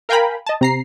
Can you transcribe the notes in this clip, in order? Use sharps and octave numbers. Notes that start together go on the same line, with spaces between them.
A#4 F5 G5 G#5 A#5 B5
D#5 A5
C3 A#5 C7